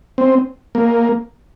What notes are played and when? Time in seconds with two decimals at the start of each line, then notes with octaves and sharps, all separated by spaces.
0.18 C4
0.75 A#3